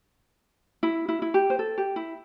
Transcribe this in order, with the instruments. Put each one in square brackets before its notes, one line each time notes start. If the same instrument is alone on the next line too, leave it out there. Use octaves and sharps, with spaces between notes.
[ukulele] E4
E4
E4
G4
C5
A4
G4
E4